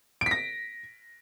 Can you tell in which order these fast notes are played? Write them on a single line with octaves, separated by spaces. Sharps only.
D7 B6 A#6